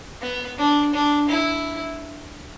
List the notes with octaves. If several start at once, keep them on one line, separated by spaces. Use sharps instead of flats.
B3
D4
D4
E4